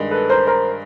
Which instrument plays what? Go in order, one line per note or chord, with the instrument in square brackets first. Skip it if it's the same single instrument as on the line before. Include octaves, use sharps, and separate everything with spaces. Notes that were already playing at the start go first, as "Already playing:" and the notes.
Already playing: [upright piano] G2 D#3 G#3
[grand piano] A4 B4
A#4 C5
A#4 C5